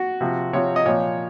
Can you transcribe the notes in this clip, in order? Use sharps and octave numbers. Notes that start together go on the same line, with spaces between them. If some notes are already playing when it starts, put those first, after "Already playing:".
Already playing: F#4
C3 F3
C3 F3 C#5
D#5
A#2 F3 C#5